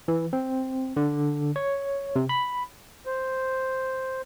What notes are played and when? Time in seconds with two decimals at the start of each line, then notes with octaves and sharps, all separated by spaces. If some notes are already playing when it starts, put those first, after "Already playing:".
0.08 E3
0.33 C4
0.97 D3
1.56 C#5
2.16 C3
2.29 B5
3.06 C5